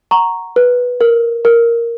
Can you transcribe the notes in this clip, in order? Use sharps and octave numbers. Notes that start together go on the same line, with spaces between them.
F#5 A#5 C#6
B4
A#4
A#4